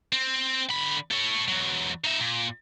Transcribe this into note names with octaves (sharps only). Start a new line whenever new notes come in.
C4
D3 B5
A4 C#5
E2 F#3
D#4 E5
A#2